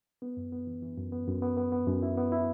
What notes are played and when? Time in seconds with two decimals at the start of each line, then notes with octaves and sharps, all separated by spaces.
0.22 B3
0.37 F#2
0.52 B3
0.67 E3
0.82 E3
0.98 F#2
1.12 B3
1.27 F#2
1.42 B3
1.57 B3
1.72 B3
1.87 F#2
2.03 E4
2.18 B3
2.32 E4